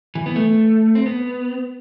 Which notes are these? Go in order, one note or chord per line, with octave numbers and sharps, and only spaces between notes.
E3
B3
A3
C4
B3